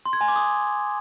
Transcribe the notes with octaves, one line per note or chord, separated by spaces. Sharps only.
C6
G#6
G#5
D6
D#6